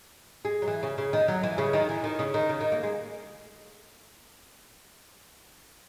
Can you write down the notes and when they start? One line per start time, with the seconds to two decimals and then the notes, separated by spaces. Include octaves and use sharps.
0.45 G#3
0.62 F#3
0.68 E3
0.83 C#3
0.98 C#3
1.13 D#3
1.28 F#3
1.43 E3
1.58 C#3
1.73 D#3
1.89 E3
2.04 D#3
2.19 C#3
2.34 D#3
2.49 C#3
2.61 D#3
2.72 A#3
2.83 G#3